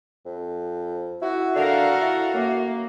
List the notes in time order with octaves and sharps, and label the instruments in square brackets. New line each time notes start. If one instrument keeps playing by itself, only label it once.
[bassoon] F2
[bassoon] E4 [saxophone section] F#4
[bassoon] D3 [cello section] A4 A#4 F5
[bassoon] E4
[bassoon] F#2 [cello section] A#3